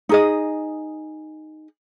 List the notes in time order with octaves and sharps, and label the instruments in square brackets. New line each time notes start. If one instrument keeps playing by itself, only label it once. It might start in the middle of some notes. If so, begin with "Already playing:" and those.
[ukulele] D#4 G#4 D#5